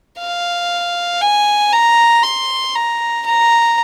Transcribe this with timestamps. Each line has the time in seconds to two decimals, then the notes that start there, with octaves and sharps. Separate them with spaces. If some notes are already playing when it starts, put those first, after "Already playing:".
0.18 F5
1.21 G#5
1.72 A#5
2.23 C6
2.75 A#5
3.26 A#5